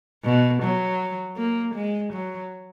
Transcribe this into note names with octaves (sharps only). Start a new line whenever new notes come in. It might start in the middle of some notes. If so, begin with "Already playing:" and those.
B2
F#3
A#3
G#3
F#3